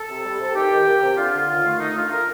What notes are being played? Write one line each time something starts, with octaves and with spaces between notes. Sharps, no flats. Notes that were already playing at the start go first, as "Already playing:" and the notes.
Already playing: A4
C3
G3
C3
D#3 G4
D#3
A#3
C3
D3 F4
D3
D#2
A3
A3 D#4
D3 F4
D3 A#4